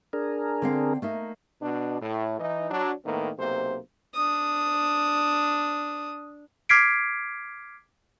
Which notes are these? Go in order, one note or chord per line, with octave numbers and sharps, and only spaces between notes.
D4 G#4 A#4
D3 C4 F5
A3 A#3 D#4
B2 D4
A2
E3 D#4
F#3 D4
A2 D#3 A#3 B3
B1 C3 A#3 C5
D4 D#6
D6 F6 G#6 B6 C7 D7